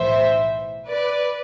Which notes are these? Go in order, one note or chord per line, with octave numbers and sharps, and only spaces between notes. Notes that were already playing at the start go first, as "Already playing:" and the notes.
Already playing: B1 A2 E3 C5 E5
B4 D5